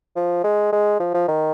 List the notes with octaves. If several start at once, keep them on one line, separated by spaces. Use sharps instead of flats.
F3
G#3
G#3
F3
F3
D#3